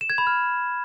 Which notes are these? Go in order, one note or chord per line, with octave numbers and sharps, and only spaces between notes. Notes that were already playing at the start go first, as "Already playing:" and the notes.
E7
G#6
B5
F6